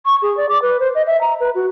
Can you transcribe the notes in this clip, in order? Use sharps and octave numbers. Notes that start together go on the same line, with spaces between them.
C#6
G#4
D5
D6
B4
C5
D#5
E5
A#5
B4
F#4